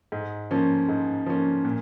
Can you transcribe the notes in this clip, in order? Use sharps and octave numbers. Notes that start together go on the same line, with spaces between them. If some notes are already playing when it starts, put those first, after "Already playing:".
G#2
F3 A#3 C#4
G#2
F3 A#3 C#4
A#2